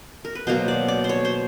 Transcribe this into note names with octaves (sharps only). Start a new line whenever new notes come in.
A#4
B4
B2 F#3 A#3 C5
D5
D5
C5
C#5
C5